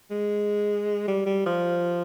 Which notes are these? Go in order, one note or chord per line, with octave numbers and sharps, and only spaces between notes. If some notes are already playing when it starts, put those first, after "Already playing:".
G#3
G3
G3
F3